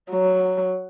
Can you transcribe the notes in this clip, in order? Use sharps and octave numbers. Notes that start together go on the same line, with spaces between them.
F#3